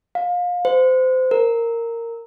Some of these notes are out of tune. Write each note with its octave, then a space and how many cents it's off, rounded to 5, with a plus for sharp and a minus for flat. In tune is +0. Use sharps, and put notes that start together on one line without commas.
F5 +30
C5 -25
A#4 -10